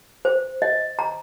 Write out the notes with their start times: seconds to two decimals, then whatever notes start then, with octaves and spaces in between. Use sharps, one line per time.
0.25 C5
0.62 D#5
0.99 A#5